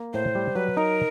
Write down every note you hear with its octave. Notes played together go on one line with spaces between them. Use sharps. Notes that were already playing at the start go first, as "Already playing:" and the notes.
Already playing: A#3
A2 C5
G3
F#3 B4
D#4 A#4